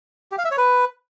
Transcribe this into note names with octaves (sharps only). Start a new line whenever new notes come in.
G4
F5
E5
C#5
B4